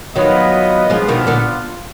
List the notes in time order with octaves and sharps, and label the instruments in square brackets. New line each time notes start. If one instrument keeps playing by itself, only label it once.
[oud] D#3 F#3 [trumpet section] B3 F4 B4 D#5
[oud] F3 G#3 [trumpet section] B3 D4 F4
[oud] B2 D#3
A#2 D3